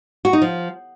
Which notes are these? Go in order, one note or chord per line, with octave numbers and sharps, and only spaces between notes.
F#4
D#4
F3